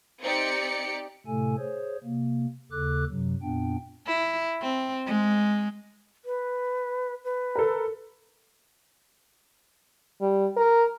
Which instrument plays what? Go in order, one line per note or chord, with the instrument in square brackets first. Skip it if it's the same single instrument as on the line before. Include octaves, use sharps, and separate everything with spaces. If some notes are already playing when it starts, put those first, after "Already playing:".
[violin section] C4 D#4 G4 D5 C#7
[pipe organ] A2 C3 A3 A4 G#5
G#4 C5 C#5
C3 A#3
D#2 C#3 A4 D6 F#6
F#2 C3 F#3
F2 A#2 B3 D4 G5
[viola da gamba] E4
C4
G#3
[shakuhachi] B4
B4
[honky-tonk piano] A4 A#4
[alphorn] G3
A#4